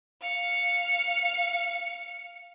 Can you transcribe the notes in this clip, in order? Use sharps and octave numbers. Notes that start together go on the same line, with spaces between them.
F5 C#7